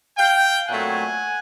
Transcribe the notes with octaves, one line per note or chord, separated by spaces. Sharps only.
F5 G5
A#2 F#3 A3 C4 F#5 G#5